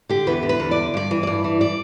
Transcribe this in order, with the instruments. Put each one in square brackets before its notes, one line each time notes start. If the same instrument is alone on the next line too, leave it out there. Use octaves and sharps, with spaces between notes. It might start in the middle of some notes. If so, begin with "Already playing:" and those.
[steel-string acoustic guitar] D3 G4
E2 B4
D3
B4
E2
D5
D3
G2 D5
E3
G2 D5
E3
D5